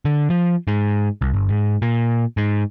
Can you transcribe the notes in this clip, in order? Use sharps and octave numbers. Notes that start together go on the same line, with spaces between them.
D3
F3
G#2
C2
G1
G#2
A#2
G#2